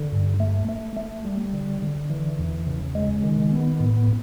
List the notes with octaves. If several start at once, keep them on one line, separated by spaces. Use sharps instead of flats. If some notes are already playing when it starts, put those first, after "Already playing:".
Already playing: D3
G2
A3
A3
A3
G3
D3
D3
E3
E2
C#3
G#3
D#3
B3
A2